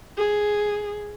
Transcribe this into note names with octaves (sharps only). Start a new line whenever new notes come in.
G#4